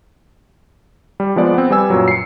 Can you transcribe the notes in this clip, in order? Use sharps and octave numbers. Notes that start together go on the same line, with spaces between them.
G3
F3 G#3 B3 D5
B3 C4
G3 B4 G#5 E6
F#2 A#2 F#3
C7 C#7